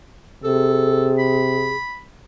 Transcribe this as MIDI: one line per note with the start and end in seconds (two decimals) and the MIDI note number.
0.44 1.77 48
0.44 1.75 68
0.44 1.11 69
1.18 2.01 83